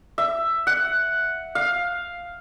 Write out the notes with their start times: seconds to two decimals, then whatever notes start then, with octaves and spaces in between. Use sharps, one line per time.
0.18 E5
0.67 F#5
1.55 F5